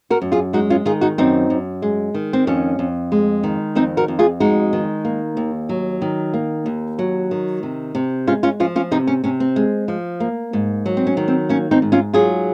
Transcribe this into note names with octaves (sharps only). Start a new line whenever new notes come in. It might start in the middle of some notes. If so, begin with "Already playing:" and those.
F#4 A#4
F#2
F4 G#4
G#3 D#4 F#4
C#4 F4
D#3 F4 G#4
D#4 F#4
F#2 C4 D#4
F#2
G#3
D#3
C4
F2 C#4
F2
G#3
D#3
F2 C4 D#4
F#4 A#4
F2
F4 G#4
G#3 D#4 F#4
D#3
A#3
D#2
F#3
D#3
A#3
D#2
F#3
D#3
C3
C3
G#3 C#4 F4
C#4 F4
F3 C#4 F4
C#4 F4
C3 C4 D#4
C#4
C3 C#4
C4
G#3
F3
A#3
G#2
F#3
C4
C#4
D#3
C4
A#3 C#4
C4 D#4
G#2
C#4 F4
F#3 F4 G#4